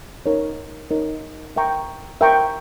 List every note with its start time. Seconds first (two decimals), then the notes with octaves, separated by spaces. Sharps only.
0.26 D#4 A#4 C#5
0.91 D#4 A#4 C#5
1.56 A#4 E5 G5 A#5 C#6
2.21 A#4 E5 G5 A#5 C#6